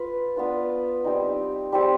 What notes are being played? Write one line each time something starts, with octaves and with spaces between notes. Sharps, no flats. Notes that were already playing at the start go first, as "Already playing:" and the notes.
Already playing: F4 B4
B3 D4 F4 B4
G3 C4 D#4
G3 C4 G4 C5